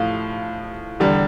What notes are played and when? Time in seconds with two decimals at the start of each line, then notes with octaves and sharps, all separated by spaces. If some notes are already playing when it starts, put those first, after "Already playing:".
Already playing: A2 F3 F5
1.00 E2 D3 G3